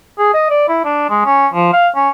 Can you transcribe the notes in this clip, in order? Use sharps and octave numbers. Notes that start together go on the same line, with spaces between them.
G#4
D#5
D5
E4
D4
G#3
C#4
F3
F5
C#4